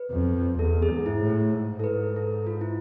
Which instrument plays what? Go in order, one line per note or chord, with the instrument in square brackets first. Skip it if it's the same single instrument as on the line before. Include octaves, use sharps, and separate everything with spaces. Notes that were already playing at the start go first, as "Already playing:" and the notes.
Already playing: [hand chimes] B4
[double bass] F2
[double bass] E2 [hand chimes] A4
[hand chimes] G#4
[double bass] G#2
[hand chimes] E4
[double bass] A2
[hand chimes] E4
[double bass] G#2
[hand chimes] A4
B4
A4
F4
E4